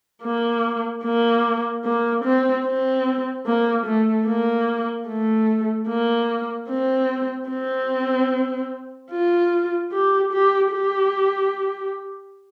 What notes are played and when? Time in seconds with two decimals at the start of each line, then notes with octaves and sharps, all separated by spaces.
0.23 A#3
1.04 A#3
1.84 A#3
2.25 C4
2.66 C4
3.46 A#3
3.86 A3
4.27 A#3
5.08 A3
5.88 A#3
6.69 C4
7.49 C4
9.11 F4
9.92 G4
10.33 G4
10.72 G4